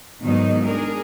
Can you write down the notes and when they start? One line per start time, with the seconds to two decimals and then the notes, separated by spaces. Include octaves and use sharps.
0.21 G#2 B2 D#3 F#3 D#4
0.62 D4 G#4 A#4